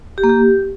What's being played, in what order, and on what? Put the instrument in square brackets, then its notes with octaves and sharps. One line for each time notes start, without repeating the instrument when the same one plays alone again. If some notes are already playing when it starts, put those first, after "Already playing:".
[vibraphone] G4
A#3
G4